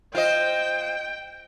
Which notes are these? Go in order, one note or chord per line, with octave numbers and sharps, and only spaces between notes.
F4 C5 D#5 G5